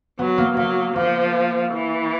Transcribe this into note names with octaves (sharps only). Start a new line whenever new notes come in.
F#3 B3
A#3
F#3 A#3
F3 A#3
E3